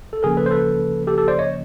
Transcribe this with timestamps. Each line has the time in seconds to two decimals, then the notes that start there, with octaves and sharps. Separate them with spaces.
0.13 A4
0.23 D2 C#3 F3 A#3 C#4 G#4 A#4
0.37 A4 B4
0.46 C5
0.51 A4 B4
1.07 G4 A4
1.18 G4 A4
1.28 C5 D5
1.39 C#5 D#5